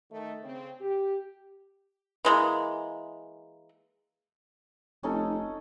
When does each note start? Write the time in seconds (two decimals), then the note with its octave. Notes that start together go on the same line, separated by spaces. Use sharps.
0.11 D#3 A3 D#4
0.43 C#3 C4
0.81 G4
2.25 E3 G#3 A#3
5.03 F1 C#4 D#4 A4